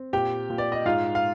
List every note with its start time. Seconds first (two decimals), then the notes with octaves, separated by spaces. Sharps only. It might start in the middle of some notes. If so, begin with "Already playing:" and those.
Already playing: C4
0.13 A#2 G4 G5
0.50 A#2
0.58 D5
0.72 D#5
0.85 G#2 F4 F5
1.15 F5